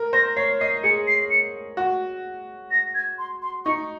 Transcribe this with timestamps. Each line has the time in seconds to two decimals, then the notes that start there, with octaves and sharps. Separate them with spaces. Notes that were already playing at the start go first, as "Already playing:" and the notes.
Already playing: A#4
0.13 C5 A#6
0.37 C#5 C7
0.60 D#5 C7
0.84 G#4 C#7
1.08 C7
1.30 C#7
1.77 F#4
2.71 A#6
2.95 G#6
3.18 C6
3.42 C6
3.65 D#4 C#6